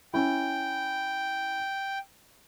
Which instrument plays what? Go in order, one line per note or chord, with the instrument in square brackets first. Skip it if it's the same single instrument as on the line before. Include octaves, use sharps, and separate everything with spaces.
[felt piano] C#4 E4 [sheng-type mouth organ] G5